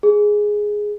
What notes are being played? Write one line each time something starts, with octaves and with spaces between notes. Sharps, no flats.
G#4